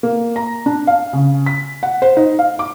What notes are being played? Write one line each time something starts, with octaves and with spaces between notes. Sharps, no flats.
A#3
A#5
D4
F5
C#3
B6
F#5
C5
D#4
F5
D6